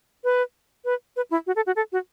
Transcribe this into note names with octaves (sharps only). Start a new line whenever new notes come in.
B4
B4
B4
E4
F#4
A4
F#4
A4
F#4